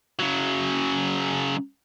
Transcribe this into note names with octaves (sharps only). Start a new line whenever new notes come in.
C#3 F#3